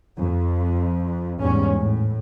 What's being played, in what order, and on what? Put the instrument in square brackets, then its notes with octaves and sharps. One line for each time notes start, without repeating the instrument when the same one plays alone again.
[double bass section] F2
E2 G#2 G3 C#4
A2